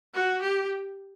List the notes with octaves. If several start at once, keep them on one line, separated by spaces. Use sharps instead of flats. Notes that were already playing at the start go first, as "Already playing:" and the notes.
F#4
G4